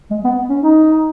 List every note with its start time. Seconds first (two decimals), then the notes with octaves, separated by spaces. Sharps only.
0.11 G#3
0.24 B3
0.50 C#4
0.62 D#4